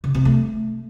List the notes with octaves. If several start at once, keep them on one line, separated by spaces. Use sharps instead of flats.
C#3
C3
A3